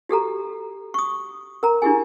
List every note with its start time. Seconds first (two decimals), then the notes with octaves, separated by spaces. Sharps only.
0.09 F#4 G4 A4 A#5
0.94 C#6 D#6
1.63 A#4 A#5
1.82 D4 E4 G4 G#4 G#5